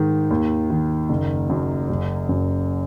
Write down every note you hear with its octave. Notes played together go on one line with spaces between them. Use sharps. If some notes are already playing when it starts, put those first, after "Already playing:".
Already playing: G#2 D#3
D#2
D#3
F#1
F#2
F#1
F#2